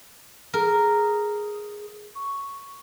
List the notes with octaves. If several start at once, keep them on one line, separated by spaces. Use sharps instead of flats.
G#4 A#4
C#6